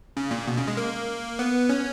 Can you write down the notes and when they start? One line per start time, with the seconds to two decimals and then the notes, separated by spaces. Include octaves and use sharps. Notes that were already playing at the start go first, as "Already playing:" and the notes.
0.17 C#3
0.31 A#2
0.47 B2
0.57 C#3
0.68 G#3
0.77 A#3
1.39 B3
1.69 C#4